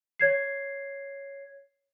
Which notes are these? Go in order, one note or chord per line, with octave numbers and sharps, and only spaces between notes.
C#5 G#6 C7